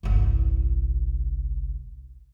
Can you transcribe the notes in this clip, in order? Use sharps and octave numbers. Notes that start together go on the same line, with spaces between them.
G1 C2